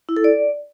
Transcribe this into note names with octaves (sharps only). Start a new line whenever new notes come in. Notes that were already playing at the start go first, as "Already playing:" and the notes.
E4
A4
D5